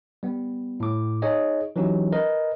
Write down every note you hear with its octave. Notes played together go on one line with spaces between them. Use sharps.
G3 B3
A2 D6
D#4 G#4 C#5 D#5
E3 F#3 C#4 D#4 G4
A#4 B4 D#5